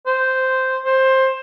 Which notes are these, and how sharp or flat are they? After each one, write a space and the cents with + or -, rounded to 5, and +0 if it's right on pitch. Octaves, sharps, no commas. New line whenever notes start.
C5 -5
C5 +15